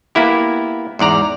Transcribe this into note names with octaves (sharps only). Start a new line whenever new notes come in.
A#3 B3 E4 G4
E2 G#2 D5 A#5